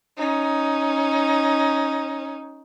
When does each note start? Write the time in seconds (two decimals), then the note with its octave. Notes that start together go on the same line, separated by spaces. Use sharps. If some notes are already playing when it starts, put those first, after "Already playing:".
0.18 C#4 D#4